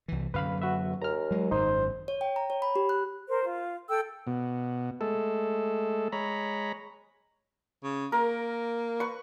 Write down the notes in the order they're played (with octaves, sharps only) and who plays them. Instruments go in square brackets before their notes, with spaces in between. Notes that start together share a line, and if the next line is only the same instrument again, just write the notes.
[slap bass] C2 E3
[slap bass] F#2 D3 F#3 [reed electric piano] B4 F5 B5
[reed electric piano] F#4 B4 E5
[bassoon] D#2 [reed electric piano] A#5 F6
[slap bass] F#3 G#3
[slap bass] G#1 F#2 [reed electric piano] D#4 [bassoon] C5
[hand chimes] C#5
G5
A#5
C#5
B5
G4
F#6
[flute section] A#4 C5
F4
A4 G5 E6
[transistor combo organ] B2
G#3 A3 A4
G#3 C#5 A#5 B5
[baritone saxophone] C#3
[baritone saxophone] A#3 [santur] A#4
[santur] B4 C#6